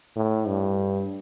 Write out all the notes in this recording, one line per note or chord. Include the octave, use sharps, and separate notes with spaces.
A2
G2